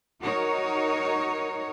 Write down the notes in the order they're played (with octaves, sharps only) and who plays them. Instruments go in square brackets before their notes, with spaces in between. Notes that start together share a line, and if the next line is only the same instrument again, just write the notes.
[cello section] D#4 F#4 A#4 C#5